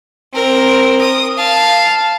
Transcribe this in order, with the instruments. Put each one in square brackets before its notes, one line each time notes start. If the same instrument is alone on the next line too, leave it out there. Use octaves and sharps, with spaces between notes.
[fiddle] C4 A#4
D#6
F5 A5